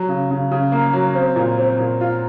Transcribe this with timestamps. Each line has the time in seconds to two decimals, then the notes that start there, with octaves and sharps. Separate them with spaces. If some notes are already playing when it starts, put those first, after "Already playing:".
Already playing: F#3
0.09 C#3
0.31 C#3
0.51 C#3
0.72 A#3
0.93 F#3
1.15 C4
1.36 A#2
1.58 C4
1.79 A#2
2.01 F4